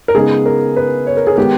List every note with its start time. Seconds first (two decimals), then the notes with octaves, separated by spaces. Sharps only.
0.08 A#4
0.15 C#3 G#3 B3 D#4 G#4
0.46 A#4
0.76 B4
1.07 C#5
1.17 A#4
1.27 G#4
1.37 D#3 G#3 B3 D#4 G4